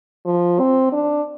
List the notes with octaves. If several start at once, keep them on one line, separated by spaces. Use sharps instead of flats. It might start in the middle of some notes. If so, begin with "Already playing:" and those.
F3
C4
D4